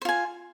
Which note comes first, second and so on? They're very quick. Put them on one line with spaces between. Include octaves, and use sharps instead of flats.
C5 F4 G#5